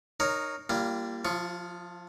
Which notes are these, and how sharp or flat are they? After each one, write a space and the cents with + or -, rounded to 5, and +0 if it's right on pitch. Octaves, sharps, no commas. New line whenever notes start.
D#4 -20 A#4 +0 C#5 +0
G3 +0 A#3 +0 F4 -45
F3 +20 F4 -30 C#6 +5